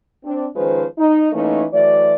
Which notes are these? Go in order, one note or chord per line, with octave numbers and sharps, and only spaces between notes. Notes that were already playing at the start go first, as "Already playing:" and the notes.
C4 D4
D#3 F3 G#3 C#4 B4 C5
D#4
E3 A3 A#3 C#4 D#4
E3 F#3 A3 D5